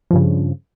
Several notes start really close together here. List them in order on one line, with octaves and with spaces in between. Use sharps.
F3 G2 C#3